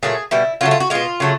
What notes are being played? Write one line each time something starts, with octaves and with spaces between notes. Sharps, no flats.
A#2 F#3 A3 G#4
B2 G3 E4
C#3 F#3 A3 F4
F4
F#4
B2 G#3 F4
C#3 F#3 A3